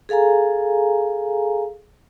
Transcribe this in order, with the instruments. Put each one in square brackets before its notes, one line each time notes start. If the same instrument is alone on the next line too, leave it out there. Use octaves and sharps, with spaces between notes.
[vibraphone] G#4 A4 F5 G#5 A#5